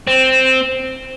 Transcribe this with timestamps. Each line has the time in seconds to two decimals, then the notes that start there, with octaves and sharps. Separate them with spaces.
0.07 C4